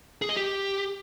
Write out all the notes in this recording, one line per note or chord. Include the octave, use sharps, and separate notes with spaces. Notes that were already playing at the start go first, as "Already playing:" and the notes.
G#4
D#5
G4